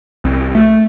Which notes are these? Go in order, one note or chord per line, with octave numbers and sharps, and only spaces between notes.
C2
A3